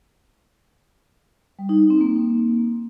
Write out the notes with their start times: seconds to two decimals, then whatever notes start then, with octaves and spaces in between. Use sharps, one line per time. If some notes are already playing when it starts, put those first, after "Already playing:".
1.59 G3
1.69 D#4
1.80 D#4
1.90 C4
2.01 A#3